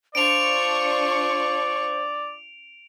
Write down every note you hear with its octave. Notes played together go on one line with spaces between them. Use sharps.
D4 F4 C5 D5 C#6 D7 F7